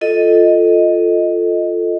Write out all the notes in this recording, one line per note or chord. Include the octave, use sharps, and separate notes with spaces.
F4 A4 D#5